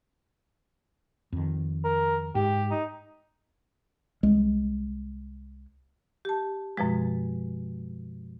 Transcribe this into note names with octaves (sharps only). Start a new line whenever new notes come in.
F2 D#3
A#4
G#2 G4
D#4
C2 G#3
G4 A5
F#2 B2 F3 G#3